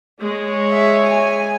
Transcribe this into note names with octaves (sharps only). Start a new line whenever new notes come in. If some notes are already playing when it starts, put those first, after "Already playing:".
G#3 C#5
E5
G#5